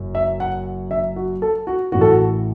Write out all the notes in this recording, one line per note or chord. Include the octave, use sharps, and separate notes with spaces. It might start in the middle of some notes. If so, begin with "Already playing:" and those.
Already playing: F#1 F#2
E5
F#5
E5
F#4
A4
F#4
A1 A2 E3 F#4
A4
F#4